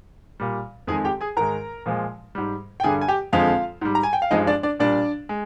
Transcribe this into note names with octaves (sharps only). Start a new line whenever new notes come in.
A#2 G3
F2 D#3 G#3 G#4 G#5
G4 G5
G#4 G#5
G#2 D#3 G#3 A#4 A#5
A#2 F3 G#3
G#2 G3
G5
G2 D3 G3 G#4 G#5
G#5
G4 G5
F2 D3 F3 G#3 F4 F5
G#2 G3
A#5
G#5
G5
F5
G2 F3 G#3 D#4 D#5
D4 D5
D4 D5
A#2 G3 D4 D5
G#3